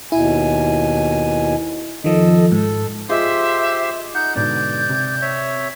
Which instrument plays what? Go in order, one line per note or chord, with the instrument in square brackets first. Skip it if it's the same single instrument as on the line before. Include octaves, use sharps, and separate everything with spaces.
[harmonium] D#2 B2 G#5 [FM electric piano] E4
[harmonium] F2 A4 D#5 [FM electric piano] D#3 F3
[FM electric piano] G#2 [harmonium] A4
[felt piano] F4 G#4 D#5 [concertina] G4 C5 C6 [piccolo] E5
[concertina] D#4 F#5 [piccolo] G6
[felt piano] G#2 B2 D3 [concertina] D5 [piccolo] G6
[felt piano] C3
[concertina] C#5 E5